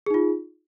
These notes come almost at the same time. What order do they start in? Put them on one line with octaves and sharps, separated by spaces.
G#4 D#4 F4